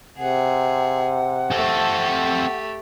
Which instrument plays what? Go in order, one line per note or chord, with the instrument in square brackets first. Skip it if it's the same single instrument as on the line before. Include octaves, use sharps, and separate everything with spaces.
[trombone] C3 [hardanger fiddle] G#4 [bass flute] F#5
[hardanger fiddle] A3 G4 [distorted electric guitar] C4 A4